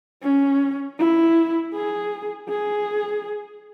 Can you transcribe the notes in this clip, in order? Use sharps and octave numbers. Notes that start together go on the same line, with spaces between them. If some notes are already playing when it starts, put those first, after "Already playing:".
C#4
E4
G#4
G#4